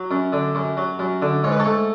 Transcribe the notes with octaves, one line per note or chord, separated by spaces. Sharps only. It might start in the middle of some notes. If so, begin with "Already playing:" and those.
Already playing: F#3
F#2
D3
F#2
F#3
F#2
D3
G#2 C#5
B4
A4 C#5
A3